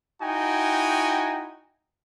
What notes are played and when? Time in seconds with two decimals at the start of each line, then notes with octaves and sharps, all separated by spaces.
0.22 D#4 E4 F#4 G5 G#5